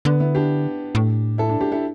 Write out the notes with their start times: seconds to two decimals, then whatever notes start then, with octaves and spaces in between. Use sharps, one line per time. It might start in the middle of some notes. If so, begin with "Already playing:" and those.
0.05 D3 B3
0.20 B3 E4
0.35 D4 G4
0.95 A2
1.38 E4 A4
1.49 D4
1.61 D4 G4
1.72 E4 A4